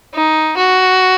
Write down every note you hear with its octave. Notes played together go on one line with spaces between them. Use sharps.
D#4
F#4